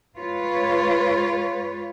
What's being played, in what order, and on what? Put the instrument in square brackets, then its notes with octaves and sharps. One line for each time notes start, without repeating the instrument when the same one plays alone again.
[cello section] G#3 F4 B4 C#5